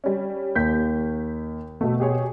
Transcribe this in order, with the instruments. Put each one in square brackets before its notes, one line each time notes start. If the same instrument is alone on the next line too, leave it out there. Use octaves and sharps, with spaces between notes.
[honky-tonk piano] G3 C#4
[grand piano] D#2 [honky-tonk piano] G6 B6
[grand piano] B2 B3 [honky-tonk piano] A3 A4
[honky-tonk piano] G4 G#4 C#5